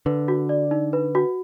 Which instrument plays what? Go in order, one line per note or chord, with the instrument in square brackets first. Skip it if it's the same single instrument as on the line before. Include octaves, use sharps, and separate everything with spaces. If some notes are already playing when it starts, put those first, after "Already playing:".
[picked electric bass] D3 [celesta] B4
[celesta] F#4
D5
D#4
B4
F#4